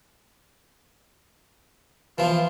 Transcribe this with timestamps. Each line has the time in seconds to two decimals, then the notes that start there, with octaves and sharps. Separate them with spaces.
2.18 E3 F3 F4